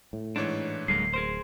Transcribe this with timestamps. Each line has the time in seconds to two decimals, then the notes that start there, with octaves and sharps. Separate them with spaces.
0.13 A2
0.36 G#2 E3 A3 D4 C#5
0.88 D1 G2 G#3 A#3 C7
1.14 G#4 A#4 C5